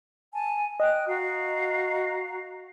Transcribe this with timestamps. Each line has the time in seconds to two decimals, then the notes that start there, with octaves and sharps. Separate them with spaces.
0.33 G#5 A5
0.80 D#5 G5 F#6
1.08 F#4 F5 A#5